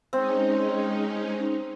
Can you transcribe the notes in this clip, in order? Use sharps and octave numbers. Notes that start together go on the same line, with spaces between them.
G#3 C4 C#4 D#4